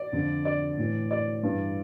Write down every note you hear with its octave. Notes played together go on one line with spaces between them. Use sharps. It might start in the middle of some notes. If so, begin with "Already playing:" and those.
Already playing: D5
F2 D3
D5
A2 E3
D5
G2 E3